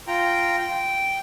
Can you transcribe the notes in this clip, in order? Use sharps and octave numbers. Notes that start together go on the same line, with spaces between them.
F4 G5 A#5
G5